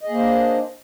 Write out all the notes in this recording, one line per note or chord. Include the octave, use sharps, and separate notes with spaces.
A#3 D4 G#4 C5 D#5